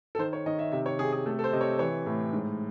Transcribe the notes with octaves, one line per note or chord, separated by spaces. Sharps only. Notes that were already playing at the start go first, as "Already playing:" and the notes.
A4
D#3 C5
C#5
D#3 D#5
E5
C3 E5
C#5
C3 G#4
G#4
A3 A4
A4
C5
C3 D#5
C#5
E3 C#5
A2
G#2